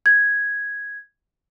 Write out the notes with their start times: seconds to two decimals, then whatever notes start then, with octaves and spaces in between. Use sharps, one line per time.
0.06 G#6